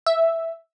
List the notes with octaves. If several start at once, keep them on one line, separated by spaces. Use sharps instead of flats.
E5